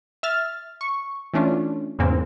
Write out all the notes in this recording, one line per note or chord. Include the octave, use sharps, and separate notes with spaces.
E5 F6 A6
C#6
E3 A3 C#4 D4 F4
E2 G#2 C#3 G#3 A#3 C4